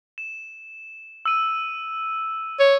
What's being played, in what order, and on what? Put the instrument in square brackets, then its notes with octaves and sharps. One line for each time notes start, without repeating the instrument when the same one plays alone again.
[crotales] E7
E6 D#7
[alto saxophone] C#5